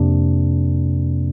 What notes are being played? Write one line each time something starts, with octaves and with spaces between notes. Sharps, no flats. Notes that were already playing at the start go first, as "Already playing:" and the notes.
Already playing: F2 C3 A#3 D4